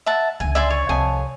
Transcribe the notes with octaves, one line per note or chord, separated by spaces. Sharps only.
E5 F#5 A5
C#2 D3 G#5
D5 E5 G#5 C6
C#5
C2 F2 D#3 G#5